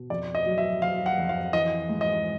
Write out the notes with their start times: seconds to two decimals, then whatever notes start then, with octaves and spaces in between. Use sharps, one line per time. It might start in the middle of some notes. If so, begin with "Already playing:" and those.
Already playing: B2
0.10 F2 D5
0.35 D#5
0.46 F#3
0.58 E5
0.82 F#3 F5
1.06 F#5
1.18 F2
1.29 F5
1.53 E3 D#5
1.89 G#2
2.01 D#5